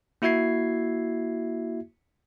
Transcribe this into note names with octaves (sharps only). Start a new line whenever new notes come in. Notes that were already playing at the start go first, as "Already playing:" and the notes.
A#3 E4 F#4 E5 G#6 C7